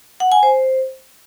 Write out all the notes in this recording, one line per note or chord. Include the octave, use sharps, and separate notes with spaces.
F#5
G#5
C5